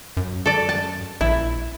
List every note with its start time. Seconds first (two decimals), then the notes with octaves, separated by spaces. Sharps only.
0.17 F#2
0.46 A4 D5
0.69 A5
1.21 A#1 E4